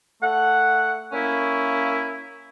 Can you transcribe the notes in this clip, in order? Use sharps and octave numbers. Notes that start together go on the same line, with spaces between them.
A3 F#5
A#3 C#4 E4